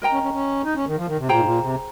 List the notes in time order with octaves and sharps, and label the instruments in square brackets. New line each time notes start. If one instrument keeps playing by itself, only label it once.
[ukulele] A#4 D#5 G5 A#5
[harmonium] C#4
C#4
C#4
D#4
C#4
D#3
F3
D#3
C3
[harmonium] A#2 [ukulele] G#4 C5 G5 A#5
[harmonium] G#2
A#2
C3